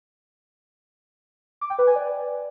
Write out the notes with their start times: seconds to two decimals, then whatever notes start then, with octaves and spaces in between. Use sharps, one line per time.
1.61 D6
1.70 G5
1.78 B4
1.87 G#5
1.96 D5